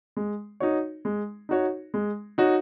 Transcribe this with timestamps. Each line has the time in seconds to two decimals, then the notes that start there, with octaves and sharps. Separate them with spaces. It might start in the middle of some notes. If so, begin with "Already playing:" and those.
0.17 G#3
0.60 D#4 F#4 C#5
1.05 G#3
1.49 D#4 F#4 C#5
1.94 G#3
2.38 D#4 F#4 C#5